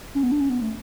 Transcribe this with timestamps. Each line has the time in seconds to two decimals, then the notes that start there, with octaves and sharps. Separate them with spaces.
0.15 C#4
0.23 B3
0.32 D4
0.40 C#4
0.49 B3
0.61 A3